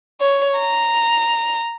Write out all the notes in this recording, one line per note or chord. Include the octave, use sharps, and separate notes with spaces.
C#5
A#5